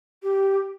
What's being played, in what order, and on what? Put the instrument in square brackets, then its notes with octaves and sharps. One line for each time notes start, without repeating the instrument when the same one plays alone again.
[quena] G4